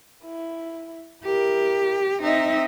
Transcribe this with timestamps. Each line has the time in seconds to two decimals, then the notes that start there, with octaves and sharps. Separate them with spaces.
0.24 E4
1.24 E4 G4 A#4
2.22 C4 D#4 D#5 E5